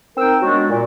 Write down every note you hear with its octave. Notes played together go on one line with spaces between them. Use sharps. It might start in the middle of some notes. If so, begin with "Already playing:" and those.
C4 D#4 A#4 G5 E6
F#3 G#3 B3 D4 F#4
A#2